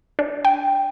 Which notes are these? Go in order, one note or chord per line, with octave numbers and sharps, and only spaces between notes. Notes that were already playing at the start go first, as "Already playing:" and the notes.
D4
G5